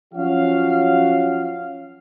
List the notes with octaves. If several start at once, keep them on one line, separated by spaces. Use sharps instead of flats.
F3 F#3 C#4 F#4 F5